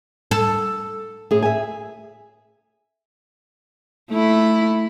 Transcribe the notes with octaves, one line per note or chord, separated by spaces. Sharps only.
A4
A2 G#4
E5 G#5
A3 E4